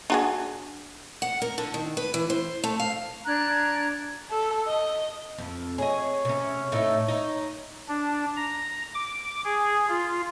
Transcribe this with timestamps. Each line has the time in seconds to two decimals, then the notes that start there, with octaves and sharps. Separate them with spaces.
0.10 D4 F#4 G#4
1.22 F#5
1.42 A#4
1.58 D3
1.74 D#3
1.97 B4
2.14 E3
2.30 C5
2.64 A3
2.80 F5
3.25 D4 A#5 F#6 G#6
4.31 A4
4.67 D#5
5.38 F2
5.78 G#4 C#5 D#5
6.25 C3 C#4
6.72 A2 A3 D#4
7.08 D#4
7.89 D4
8.37 A#5
8.94 D6
9.45 G#4
9.88 F4